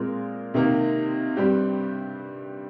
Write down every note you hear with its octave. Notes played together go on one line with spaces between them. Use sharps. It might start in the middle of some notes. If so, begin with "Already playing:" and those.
Already playing: A#2 G#3 C4 F4 A#4
C3 D#3 A#3 D#4
G2 G3 C4 G4